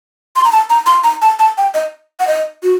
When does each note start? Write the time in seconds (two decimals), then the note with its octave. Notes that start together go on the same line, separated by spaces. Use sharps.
0.36 C6
0.44 A#5
0.52 A5
0.70 A#5
0.86 C6
1.04 A#5
1.22 A5
1.39 A5
1.58 G5
1.74 D#5
2.20 F#5
2.27 D#5
2.63 F#4